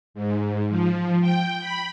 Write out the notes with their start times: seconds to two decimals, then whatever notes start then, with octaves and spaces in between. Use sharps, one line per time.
0.14 G#2
0.69 F3
1.21 G5
1.61 B5